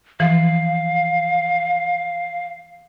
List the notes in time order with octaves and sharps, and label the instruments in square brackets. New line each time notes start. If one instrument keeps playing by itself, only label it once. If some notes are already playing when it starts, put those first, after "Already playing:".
[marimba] E3 F3 [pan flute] F5